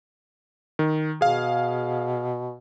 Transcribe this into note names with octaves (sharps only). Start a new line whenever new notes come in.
D#3
B2 G#4 F5